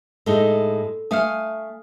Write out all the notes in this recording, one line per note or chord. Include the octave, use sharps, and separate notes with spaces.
A2 G#3 D#4 A4 G7
A3 F5 G#5 D#6 F6